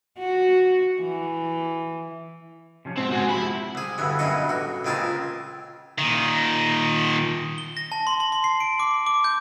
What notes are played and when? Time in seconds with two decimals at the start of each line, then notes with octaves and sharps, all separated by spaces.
0.19 F#4
1.01 E3
2.85 C3 F3 C#4
2.98 G#2 B2 G#3 C4
3.12 G#3 F#4 G#4
3.30 C3 F3 E4 B5
3.75 C2 G#4
3.98 D2 G2 E3 C#4
4.19 G2 B2 E3 A#3 D#5 C#6
4.49 A1 F#4
4.85 C#2 A#2 C4 G#4 A#4 A5
5.99 A#2 D#3
7.58 G7
7.77 A#6
7.92 A5
8.07 C6
8.20 C6
8.32 C6
8.44 C7
8.60 D7
8.80 D6
9.06 D6
9.24 G6